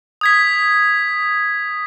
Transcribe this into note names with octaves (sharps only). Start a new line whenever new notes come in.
D#6 G#6 B6